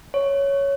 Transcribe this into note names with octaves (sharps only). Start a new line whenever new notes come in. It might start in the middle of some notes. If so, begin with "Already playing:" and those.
C#5